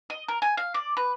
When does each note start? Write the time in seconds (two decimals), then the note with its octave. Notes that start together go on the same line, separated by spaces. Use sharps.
0.10 D#5
0.28 A#4
0.42 G#5
0.57 F5
0.74 D5
0.97 B4